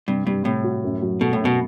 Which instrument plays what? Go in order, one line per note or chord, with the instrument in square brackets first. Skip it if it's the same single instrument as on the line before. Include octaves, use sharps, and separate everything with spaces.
[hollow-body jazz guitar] G2 [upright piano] C3
[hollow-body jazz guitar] G2 [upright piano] G3
[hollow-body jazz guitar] A2 [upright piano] C3
[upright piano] F#4
F#2
F#3
[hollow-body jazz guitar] B2 [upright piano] A3
[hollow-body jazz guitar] A2
[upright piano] F#2
[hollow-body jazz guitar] B2